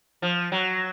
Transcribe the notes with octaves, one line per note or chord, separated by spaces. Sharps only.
F3
F#3